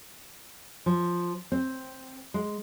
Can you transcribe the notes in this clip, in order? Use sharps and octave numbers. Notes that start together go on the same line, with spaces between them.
F3
C4
G#3